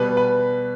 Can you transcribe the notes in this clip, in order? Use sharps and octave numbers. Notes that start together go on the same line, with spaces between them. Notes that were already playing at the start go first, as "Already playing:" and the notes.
Already playing: B2 G3 B3 B4
B4